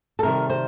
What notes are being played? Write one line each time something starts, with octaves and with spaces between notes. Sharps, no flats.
A4
C3 D#3 G3 A#4
C5